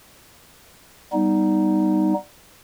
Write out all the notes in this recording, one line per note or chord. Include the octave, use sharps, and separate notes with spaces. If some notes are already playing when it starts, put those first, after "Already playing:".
G3 B3 D#4